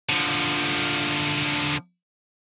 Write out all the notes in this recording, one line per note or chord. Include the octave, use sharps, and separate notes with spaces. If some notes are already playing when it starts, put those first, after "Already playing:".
D3 F3